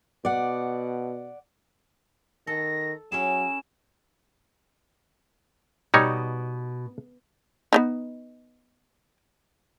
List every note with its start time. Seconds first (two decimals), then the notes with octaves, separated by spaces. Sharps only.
0.25 B2 D5 F#5
2.47 D#3 A4 A#6
3.12 F#3 C#4 E4 G#4 E7
5.94 B2 G3 D#4 C#5
7.73 B3 D4 D#4